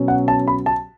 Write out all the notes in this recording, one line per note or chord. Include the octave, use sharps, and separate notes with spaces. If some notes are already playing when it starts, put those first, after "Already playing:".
Already playing: B2 F#3 C#4
F#5
A5
B5
A5